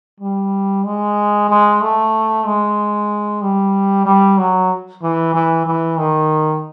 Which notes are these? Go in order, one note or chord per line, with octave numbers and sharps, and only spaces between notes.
G3
G#3
G#3
A3
G#3
G3
G3
F#3
E3
E3
E3
D#3